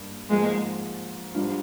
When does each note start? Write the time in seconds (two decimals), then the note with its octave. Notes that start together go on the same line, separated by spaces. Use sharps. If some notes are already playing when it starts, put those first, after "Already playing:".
Already playing: G2 A#3
0.30 G#2 F3 G#3 A#3
1.34 G#2 G3 D4 F4